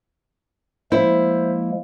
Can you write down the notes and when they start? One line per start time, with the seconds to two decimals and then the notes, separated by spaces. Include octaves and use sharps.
0.92 F3 G#3 A#3 E4 C5 E5